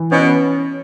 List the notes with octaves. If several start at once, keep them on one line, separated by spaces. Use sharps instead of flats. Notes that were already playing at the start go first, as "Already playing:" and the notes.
Already playing: E3
B2 C#4